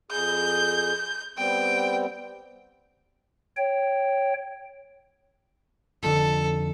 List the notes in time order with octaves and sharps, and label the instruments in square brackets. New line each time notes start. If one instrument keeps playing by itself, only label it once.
[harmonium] F2 G#4 [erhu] G6
[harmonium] G3 B3 C4 [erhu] G5
[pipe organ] C#5 G5
[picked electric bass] F1 F2 D3 [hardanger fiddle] A4